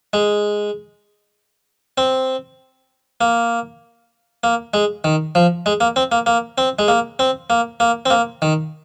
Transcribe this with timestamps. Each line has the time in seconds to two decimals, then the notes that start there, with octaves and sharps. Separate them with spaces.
0.13 G#3
1.98 C4
3.21 A#3
4.44 A#3
4.74 G#3
5.04 D#3
5.35 F3
5.66 G#3
5.81 A#3
5.96 C4
6.12 A#3
6.26 A#3
6.58 C4
6.79 G#3
6.88 A#3
7.19 C4
7.50 A#3
7.80 A#3
8.06 C4
8.10 A#3
8.42 D#3